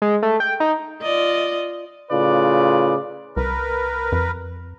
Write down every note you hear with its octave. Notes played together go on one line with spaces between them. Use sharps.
G#3
A3
G5
D#4
F4 D5 D#5
A2 C#3 F4 B4 D5
C2 A#4 B4
F2